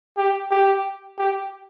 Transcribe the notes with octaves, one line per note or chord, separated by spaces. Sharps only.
G4
G4
G4